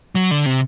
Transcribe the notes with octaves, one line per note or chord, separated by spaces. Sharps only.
F#3
D3
C3